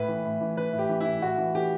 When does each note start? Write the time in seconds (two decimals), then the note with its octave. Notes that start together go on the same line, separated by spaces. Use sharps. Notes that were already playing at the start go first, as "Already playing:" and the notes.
Already playing: A2 B4
0.08 E3
0.25 A2
0.41 E3
0.57 E3 B4
0.73 A2
0.79 G4
0.89 E3
1.00 A2 E4
1.22 A2 F#4
1.38 E3
1.54 E3 G4